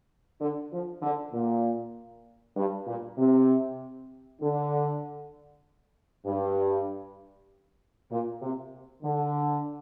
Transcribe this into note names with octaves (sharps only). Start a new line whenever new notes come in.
D3
F3
D3
A#2
G2
A#2
C3
D3
G2
A#2
C3
D3